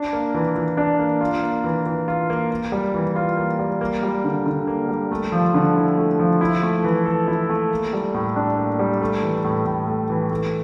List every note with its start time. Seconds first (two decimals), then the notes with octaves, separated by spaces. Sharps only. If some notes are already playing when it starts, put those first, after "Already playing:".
Already playing: D4
0.13 A#3
0.34 E3
0.56 E3
0.77 D4
0.99 A#3
1.21 F4
1.43 A#3
1.64 E3
1.86 E3
2.08 F4
2.30 A#3
2.51 A#3
2.72 G3
2.94 E3
3.16 F4
3.37 A#3
3.59 G3
3.81 A#3
4.03 G3
4.24 D3
4.46 D3
4.67 A#3
4.89 G3
5.11 A3
5.32 F3
5.54 D3
5.76 E4
5.97 A3
6.19 F3
6.41 E4
6.63 A3
6.84 E3
7.06 A4
7.28 E4
7.50 A3
7.71 A#3
7.93 G3
8.14 A2
8.36 D4
8.57 A#3
8.79 G3
9.01 A3
9.23 E3
9.44 A2
9.66 A2
9.87 A3
10.10 E3
10.31 A3